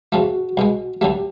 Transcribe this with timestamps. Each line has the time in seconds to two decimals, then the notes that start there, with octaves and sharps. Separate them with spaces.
0.12 E2 C3 F3 A3 F#4
0.57 C2 B2 G#3
1.01 D2 D3 F#3 A3 G4